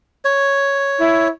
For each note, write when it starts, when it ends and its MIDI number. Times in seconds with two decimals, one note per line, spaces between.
0.25 1.28 73
0.98 1.26 64